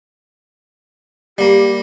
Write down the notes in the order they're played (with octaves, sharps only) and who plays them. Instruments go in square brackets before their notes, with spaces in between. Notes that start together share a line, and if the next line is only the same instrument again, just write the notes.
[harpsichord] G3 A#3 [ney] G4